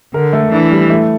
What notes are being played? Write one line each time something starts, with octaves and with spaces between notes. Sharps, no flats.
D3 A#4
A3
E3 D4
G3
A3